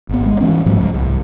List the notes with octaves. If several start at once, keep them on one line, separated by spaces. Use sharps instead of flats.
G#1 B3
G#3
E3 B3 C#4
G#2 F3 G3 A3
C#2
C2